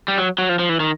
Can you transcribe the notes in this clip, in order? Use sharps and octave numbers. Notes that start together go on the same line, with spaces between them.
G3
F#3
F#3
F3
F3
E3
D#3